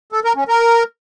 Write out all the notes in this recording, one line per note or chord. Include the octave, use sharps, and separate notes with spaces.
A4
A#4
C#4
A#4